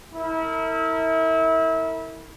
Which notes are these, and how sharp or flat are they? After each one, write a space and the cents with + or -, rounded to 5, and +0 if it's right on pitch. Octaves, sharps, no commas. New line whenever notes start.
E4 -30 A#4 -35